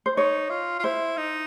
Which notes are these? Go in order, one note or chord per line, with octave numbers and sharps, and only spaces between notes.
C5
D#4 C#5
F4
F4
E4 C5
D#4